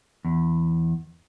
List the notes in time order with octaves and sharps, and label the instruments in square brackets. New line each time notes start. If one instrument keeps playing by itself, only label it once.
[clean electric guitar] E2